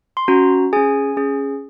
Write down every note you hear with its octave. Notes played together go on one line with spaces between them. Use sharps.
C6
C#4 F#4 A#5
C#4 G#4 G#5
C#4 G#4